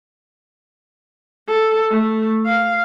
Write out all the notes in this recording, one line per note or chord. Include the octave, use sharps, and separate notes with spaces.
A4
A3
F5